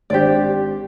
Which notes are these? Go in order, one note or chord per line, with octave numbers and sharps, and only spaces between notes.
G#1 D4 G4 C5 D5